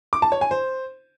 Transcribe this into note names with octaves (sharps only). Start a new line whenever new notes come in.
D6
A5
C#5
G#5
C5